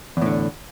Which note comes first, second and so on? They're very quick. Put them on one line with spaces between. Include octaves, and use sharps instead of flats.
E2 A2 D3